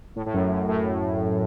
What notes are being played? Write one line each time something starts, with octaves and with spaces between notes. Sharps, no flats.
A2
A2
F#2
F#2
A2